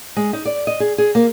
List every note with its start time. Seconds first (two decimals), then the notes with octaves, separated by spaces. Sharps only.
0.16 G#3
0.33 D#4
0.45 D5
0.67 D#5
0.80 G#4
0.98 G#4
1.15 A#3